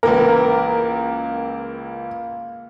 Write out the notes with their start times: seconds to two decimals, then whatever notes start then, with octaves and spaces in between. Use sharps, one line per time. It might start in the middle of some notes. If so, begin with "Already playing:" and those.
0.03 C#2 E3 A#3 A#4 A#5